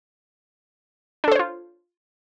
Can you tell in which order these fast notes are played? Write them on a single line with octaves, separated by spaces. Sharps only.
D4 A4 C5 C#5 F4